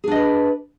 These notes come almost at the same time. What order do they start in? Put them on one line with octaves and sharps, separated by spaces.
G#4 D4 D#5 B4